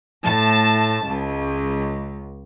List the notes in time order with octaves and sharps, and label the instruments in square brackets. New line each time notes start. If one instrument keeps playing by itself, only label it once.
[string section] A2 A5
C#2